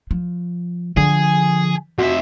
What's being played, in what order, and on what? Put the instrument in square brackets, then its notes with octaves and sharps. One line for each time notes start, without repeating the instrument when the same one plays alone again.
[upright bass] F3
[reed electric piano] D3 [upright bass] F3 [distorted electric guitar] G#4
[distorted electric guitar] F2 E5 [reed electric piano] F#4